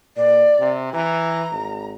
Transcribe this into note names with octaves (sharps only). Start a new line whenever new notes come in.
A#2 D5
C3
E3 A#5
G#1